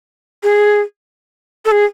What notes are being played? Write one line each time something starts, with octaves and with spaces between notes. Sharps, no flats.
G#4
A4
G#4